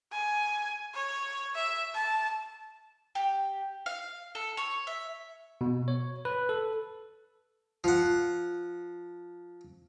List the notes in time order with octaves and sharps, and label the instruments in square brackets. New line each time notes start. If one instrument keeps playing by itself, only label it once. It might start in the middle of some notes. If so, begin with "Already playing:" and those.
[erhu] G#5
C#5
E5
A5
[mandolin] G4
F5
A4
C#5
E5
[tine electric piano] B2
C#5
B4
A4
[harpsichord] F3 F#5